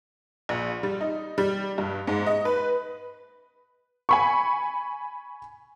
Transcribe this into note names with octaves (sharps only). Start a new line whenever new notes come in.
A#1
G3
D#4
G3
G2
G#2
D#5
B4
G#5 B5 C#6